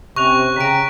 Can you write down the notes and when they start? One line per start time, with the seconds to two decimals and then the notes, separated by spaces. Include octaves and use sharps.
0.16 C3 C#4 C#6 F#6 F7
0.56 C#3 G5 A#5 B6 D7